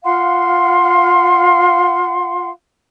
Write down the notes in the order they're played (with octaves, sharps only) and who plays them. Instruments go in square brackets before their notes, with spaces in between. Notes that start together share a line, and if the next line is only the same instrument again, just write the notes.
[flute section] F4 F5 F#5 C6